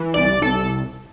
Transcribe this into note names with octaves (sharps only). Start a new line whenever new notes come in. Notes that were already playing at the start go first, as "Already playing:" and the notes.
Already playing: E3
C2 D5
C2 A4